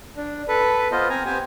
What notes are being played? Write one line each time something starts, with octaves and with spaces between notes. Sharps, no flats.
D4
A4 B4
B3 F4 C5 D#5
C4 G#5 A#5
B3 C4 G4 C5 G#5